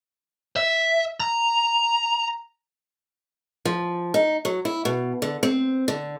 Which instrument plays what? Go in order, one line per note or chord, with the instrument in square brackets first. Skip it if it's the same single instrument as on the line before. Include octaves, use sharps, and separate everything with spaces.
[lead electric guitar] E5
A#5
[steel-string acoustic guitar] F3
D#4
F#3
E4
B2
D3
C4
D3